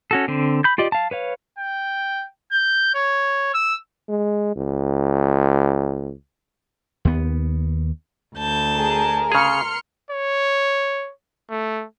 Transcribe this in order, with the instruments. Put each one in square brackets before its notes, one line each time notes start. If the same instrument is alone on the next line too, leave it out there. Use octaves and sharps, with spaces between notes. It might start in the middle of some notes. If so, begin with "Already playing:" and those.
[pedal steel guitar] C#4 F#4 A4
D3 C4
B5 G6
F4 G4 D5 D#5
F5 A5
B4 C#5 F5
[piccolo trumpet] G5
G6
C#5
E6
[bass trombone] G#3
C#2
[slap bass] D#2 B3
[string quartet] D2 A5 G6
[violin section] G#4 [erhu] A#4
[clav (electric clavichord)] C#3 G#4 [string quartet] C6 [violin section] F6 C#7
[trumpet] C#5
A3